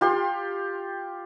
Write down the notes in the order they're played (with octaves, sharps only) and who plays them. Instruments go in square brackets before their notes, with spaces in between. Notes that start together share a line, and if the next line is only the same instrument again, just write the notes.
[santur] F4 G4 C6